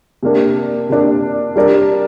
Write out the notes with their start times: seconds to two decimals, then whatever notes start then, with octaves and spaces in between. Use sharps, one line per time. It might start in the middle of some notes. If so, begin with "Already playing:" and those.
0.23 C3 A#3 D4
0.89 C3 A#3 D4
1.56 G3 D4 A#4 D5